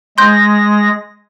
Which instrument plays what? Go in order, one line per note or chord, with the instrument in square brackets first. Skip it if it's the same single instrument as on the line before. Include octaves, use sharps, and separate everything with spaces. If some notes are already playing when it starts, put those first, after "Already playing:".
[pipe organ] G#3 A#6 [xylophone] C6 G6